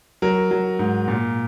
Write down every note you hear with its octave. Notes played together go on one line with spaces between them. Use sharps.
F#3 A#4
F#3
G#2
A#2